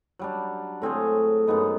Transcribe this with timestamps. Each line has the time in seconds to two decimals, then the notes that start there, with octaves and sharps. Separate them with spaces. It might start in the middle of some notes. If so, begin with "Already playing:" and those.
0.19 F#3 G3 D4
0.82 A2 C4 G#4 C#5
1.47 F#2 G#3 B3 D#4